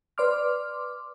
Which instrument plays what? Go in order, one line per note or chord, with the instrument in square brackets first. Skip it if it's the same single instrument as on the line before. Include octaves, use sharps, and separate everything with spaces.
[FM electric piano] B4 D5 C6 D6 F6